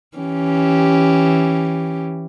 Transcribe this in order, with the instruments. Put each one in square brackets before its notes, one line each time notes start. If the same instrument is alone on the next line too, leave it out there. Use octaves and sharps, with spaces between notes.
[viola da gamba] E3 C#4 G4